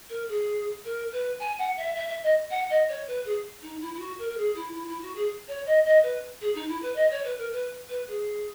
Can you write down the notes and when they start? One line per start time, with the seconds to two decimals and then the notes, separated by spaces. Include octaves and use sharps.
0.09 A#4
0.28 G#4
0.84 A#4
1.12 B4
1.39 G#5
1.58 F#5
1.77 E5
1.95 E5
2.09 E5
2.23 D#5
2.50 F#5
2.70 D#5
2.88 C#5
3.07 B4
3.25 G#4
3.62 D#4
3.81 E4
3.94 E4
3.99 F#4
4.18 A#4
4.29 A#4
4.37 G#4
4.55 E4
4.73 E4
4.87 E4
5.02 F#4
5.15 G#4
5.47 C#5
5.66 D#5
5.85 D#5
6.03 B4
6.40 G#4
6.55 D#4
6.68 E4
6.82 B4
6.95 D#5
7.10 C#5
7.24 B4
7.37 A#4
7.52 B4
7.89 B4
8.07 G#4